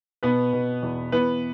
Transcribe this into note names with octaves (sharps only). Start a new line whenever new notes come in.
B2 B3 B4
B2
E2
E3 B3 B4